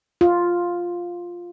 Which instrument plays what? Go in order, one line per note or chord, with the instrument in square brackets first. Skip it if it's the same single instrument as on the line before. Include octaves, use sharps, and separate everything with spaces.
[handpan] F4